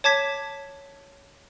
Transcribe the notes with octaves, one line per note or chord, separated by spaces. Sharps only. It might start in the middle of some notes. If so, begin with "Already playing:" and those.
C#5 A5 D6 G#6 B6